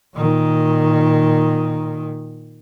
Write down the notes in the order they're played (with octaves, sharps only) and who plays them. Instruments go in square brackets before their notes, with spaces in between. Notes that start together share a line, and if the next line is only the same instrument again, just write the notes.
[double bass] A#2 D#3